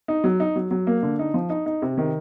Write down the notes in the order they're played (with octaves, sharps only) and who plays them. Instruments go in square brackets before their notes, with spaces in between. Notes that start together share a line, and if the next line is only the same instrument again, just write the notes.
[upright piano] D#4
F#3
D#4
F#3
F#3
A#3
D3
D#4
F3
D#4
D#4
C3
D#3